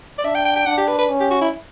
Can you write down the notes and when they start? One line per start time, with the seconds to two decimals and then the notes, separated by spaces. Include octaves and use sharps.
0.19 D5
0.24 D4 E5
0.35 G5
0.45 G5
0.56 G5
0.66 D4 F#5
0.77 G4
0.88 B4
0.99 B4
1.09 C#4
1.20 G4
1.30 F#4
1.41 E4